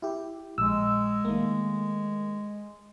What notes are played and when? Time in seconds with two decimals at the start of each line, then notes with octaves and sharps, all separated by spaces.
0.02 E4 G4
0.58 A#1 G#3 E6
1.25 D#3 A3 A#3